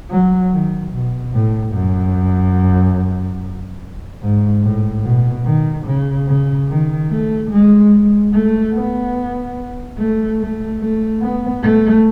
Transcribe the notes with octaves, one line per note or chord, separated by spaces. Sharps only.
F#3
D#3
B2
A2
F#2
G#2
A2
B2
D#3
C#3
C#3
D#3
A3
G#3
A3
B3
A3
A3
A3
B3
A3